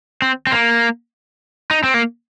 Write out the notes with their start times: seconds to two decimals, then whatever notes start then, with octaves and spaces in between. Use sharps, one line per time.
0.22 C4
0.47 C4
0.52 A#3
1.71 D#4
1.84 C4
1.94 A#3